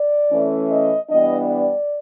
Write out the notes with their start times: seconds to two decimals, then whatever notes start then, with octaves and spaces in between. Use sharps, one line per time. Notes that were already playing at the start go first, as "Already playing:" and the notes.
Already playing: D5
0.29 E3 A3 C#4
0.69 D#5
1.08 E3 G3 B3 D4 D#5
1.49 D5